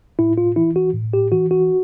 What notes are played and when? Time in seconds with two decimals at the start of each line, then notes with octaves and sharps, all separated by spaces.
0.19 A2 E4
0.38 F4
0.56 E3 E4
0.76 F#4
0.94 A2
1.13 G4
1.32 E3 F#4
1.51 F#4